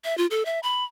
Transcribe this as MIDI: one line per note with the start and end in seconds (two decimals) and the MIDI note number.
0.04 0.17 76
0.18 0.26 65
0.31 0.45 69
0.45 0.59 76
0.63 0.84 83